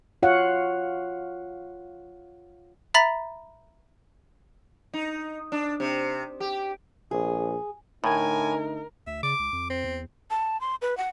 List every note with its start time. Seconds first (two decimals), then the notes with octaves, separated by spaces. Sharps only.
0.23 F4 C#5 F5 F#5
2.94 E5 A#5 B5 A6 B6 F#7
4.94 D#4
5.52 D4
5.80 C3
6.40 G4
7.11 A#1 G#4
8.04 A2 D3 A3 D#4 A#4 G#5
9.07 D2 E5
9.23 C#3 D6
9.39 C#2
9.53 F2
9.70 C4
9.84 E2
10.30 A5
10.61 C6
10.82 B4
10.97 F#5